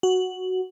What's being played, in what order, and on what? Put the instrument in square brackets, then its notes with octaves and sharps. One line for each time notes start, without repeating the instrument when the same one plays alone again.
[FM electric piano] F#4